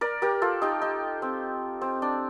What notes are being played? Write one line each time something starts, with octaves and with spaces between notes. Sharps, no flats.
A#4 D5
G4 A#4
F4 A4
D#4 G4
D#4
C4
C4
D4